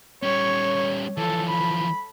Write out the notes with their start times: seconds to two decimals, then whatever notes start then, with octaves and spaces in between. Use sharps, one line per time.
0.23 G3 C#4 C#5
1.17 E3 F3 A4
1.49 B5